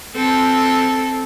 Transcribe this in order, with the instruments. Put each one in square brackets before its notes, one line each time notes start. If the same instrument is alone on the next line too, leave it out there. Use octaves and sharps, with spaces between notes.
[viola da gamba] C4 A4